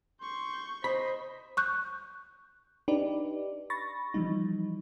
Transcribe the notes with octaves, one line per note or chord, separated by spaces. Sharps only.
C6 C#6 G6
C5 D#5 B5
C#6 F#6 G6
D4 D#4 G4 B4 D5
B5 C#6 A6 A#6
E3 F3 G3 D#4